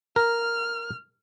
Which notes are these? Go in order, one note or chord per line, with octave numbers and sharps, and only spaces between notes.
A#4 F6